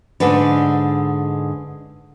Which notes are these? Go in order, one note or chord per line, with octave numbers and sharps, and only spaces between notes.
G#2 D3 G#3 D4 B4